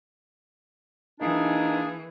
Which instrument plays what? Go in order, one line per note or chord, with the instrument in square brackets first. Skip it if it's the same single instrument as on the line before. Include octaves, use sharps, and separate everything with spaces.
[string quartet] E3 [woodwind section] A#3 D4 G#4 [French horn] D#4